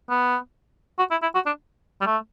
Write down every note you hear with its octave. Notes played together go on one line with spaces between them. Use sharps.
B3
F#4
E4
E4
F#4
D4
G3
A3